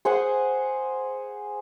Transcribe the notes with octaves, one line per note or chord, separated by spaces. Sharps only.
G#4 C5 F#5 G#5